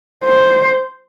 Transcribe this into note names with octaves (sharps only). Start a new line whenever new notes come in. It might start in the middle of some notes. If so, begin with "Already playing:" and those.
C5